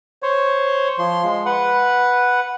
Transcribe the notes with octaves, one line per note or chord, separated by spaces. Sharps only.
C5 C#5
F3 C6
G#3
B4 F#5